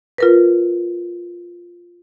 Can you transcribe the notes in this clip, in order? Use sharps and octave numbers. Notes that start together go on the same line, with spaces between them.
F4 A#4 B4